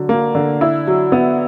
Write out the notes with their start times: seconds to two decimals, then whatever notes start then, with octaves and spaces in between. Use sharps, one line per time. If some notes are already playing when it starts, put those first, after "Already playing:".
Already playing: D3 F#3
0.09 A#3
0.35 D3
0.61 E4
0.87 F#3
1.12 B3